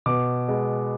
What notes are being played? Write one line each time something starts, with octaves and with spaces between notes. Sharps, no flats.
B2 D6
G#3 B3